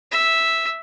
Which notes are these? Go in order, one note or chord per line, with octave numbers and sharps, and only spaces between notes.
E5